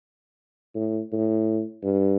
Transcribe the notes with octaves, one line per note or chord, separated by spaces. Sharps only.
A2
A2
G2